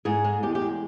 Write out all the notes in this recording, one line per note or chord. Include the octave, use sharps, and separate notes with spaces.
G#2 G#4
G#3
E2 G4
G4
G#3